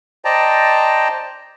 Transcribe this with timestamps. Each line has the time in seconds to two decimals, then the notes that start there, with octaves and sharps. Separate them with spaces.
0.25 C5 D5 D#5 G5 A5 A#5